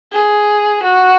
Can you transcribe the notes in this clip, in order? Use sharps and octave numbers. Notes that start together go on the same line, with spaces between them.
G#4
F#4